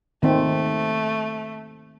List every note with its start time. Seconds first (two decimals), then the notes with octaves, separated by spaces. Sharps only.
0.23 D#3 A3 C4